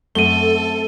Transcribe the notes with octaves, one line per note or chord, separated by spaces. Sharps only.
F#2 A3 C4 A4 F#5 D#7 G7